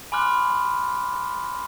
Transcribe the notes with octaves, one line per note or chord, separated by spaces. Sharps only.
G#5 B5 C6 D6 F6 F#6